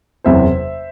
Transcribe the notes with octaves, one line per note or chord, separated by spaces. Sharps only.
F#1 E2 C3 C5 E5